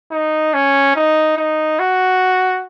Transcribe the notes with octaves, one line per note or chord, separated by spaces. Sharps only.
D#4
C#4
D#4
D#4
F#4